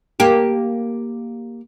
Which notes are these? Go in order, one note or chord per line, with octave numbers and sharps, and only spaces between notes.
A#3 G4